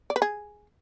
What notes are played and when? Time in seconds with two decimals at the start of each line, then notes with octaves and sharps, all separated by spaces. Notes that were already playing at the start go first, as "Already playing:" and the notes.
0.10 D5
0.16 B4
0.22 G#4